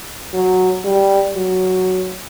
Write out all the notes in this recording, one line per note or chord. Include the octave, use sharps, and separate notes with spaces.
F#3
G3
F#3